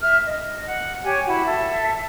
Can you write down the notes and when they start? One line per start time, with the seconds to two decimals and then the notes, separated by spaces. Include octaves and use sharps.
0.01 E5 F6
0.25 D#5
0.65 F#5
1.03 G4 C#5 G#5
1.26 E4 F#4
1.45 A4 E5